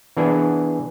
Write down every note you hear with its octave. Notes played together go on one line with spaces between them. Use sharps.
E3 B3 D4 G#4 B4 G#5